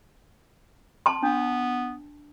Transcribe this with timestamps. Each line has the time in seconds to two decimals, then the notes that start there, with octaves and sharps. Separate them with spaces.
1.06 A5 C6
1.23 B3 D4